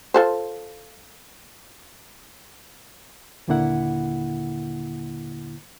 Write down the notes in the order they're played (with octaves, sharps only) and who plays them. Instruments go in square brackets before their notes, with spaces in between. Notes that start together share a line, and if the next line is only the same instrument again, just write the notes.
[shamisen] F4 A4 C5
[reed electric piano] D#2 A#2 D3 A#3 E4 F#5